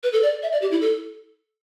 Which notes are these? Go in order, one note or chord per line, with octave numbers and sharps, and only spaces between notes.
B4
A4
D5
E5
D5
G4
E4
A4